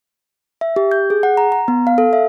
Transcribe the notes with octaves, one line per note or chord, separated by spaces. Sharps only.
E5
G4
G6
G#4
F#5
A#5
A#5
B3
F5
A4
E5